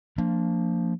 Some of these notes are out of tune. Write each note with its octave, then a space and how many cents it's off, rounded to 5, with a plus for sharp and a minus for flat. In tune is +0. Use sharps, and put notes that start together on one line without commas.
F3 +0 A#3 -20 D4 -15